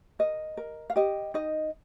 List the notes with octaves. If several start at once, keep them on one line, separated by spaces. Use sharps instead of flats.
A#4 D#5
A#4
F5
G4 D#5
D#4 D#5